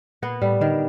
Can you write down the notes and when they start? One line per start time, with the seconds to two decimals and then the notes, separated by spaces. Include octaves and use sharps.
0.22 A#2 B3
0.42 A2 G3
0.61 D3 D#3